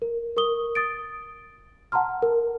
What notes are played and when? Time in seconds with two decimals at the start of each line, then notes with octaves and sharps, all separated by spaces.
0.02 A#4
0.37 A#4 C#6 D#6 G7
0.75 D#6 A6 D7
1.92 F#5 A5 A#5 C6 F6
2.22 A#4